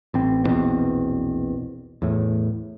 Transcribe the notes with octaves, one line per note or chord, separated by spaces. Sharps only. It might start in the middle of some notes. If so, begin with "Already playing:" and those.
A1 C4
A#1 E2 B2 C4
E2 A2